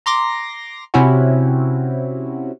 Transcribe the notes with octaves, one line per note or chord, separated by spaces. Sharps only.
A#5 C6 D6 A#6
C3 C4 C#4 E4 F#4